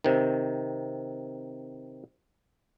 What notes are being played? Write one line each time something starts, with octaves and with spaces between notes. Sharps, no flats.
C3 D#3